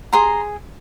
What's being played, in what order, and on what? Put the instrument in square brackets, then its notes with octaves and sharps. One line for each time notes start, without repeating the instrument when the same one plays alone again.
[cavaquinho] G#4 A#5 C6